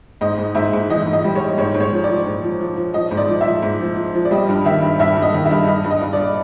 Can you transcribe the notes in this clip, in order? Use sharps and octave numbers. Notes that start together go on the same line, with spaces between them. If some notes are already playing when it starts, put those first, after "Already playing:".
G#2 D#5
G#2
G#2 E5
G#2
E3 D#5
G#2
D#5
G3
G3 C#5
G#2 C#5
G#2
C#5
F3
D5
F3
G#2
F3
F3
F3
F3 D#5
G#2
D5
F3
E5
F3
G#2
F3
F3
F3
D5
G3 D#5
G2
D#3 E5
G2
G2 E5
G2
D#5
D#3
E5
G2
G2 D#5
G2
D#5
G2
D5